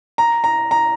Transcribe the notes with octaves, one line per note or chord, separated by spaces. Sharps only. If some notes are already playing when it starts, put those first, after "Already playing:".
A#5
A#5
A#5